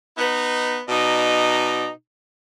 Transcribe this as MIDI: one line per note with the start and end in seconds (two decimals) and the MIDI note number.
0.18 0.80 59
0.18 0.80 63
0.89 1.88 47
0.89 1.88 63
0.89 1.88 74
0.89 1.88 82